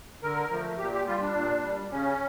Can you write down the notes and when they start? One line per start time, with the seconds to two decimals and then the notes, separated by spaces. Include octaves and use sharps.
0.23 D3 A#4
0.51 F3 A3
0.79 A#2 G4
0.94 G4
1.07 G3 F4
1.21 D4
1.35 A#2
1.63 G3
1.91 C#3 C#4